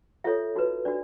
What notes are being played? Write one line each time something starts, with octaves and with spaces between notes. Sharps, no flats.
F4 A4 C#5 E5
D#4 F#4 B4
D4 F#4 D5